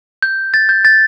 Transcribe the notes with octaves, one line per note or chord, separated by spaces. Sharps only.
G6
A6
G6
A6